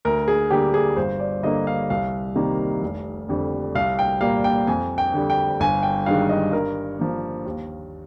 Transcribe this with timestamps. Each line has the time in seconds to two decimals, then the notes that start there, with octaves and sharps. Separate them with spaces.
0.05 D2 A#4
0.28 G#4
0.51 D3 G3 A#3 G4
0.74 G#4
0.97 G1 C5
1.20 D5
1.43 G2 D3 G3 A#3 D#5
1.67 F5
1.90 C2 F5
2.36 C3 D#3 G3 A#3
2.82 F1
3.28 F2 D3 G3
3.75 C2 F5
3.99 G5
4.21 A#2 G3 A#3 F5
4.44 G5
4.67 F2 G#5
4.98 G5
5.14 D3 G3
5.30 G5
5.60 G1 G#5
5.83 G5
6.06 G2 D#3 G#3 F5
6.29 D#5
6.52 G2 A#4
6.99 F3 A#3
7.45 D#2